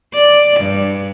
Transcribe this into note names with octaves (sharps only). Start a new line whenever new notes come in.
D5
G2